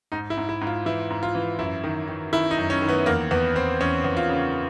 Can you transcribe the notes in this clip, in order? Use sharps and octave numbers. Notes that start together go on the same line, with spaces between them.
G#2 D#4
E4
G#2
E4
G#2
F4
E3 E4
G#2
F4
E3
F#2 E4
D#3
D#3
D#3 E4
D#4
F#2
C#4
D#3
B3
E2 A#3
E2 B3
E2 C4
E2 C#4
E2
F4
C#3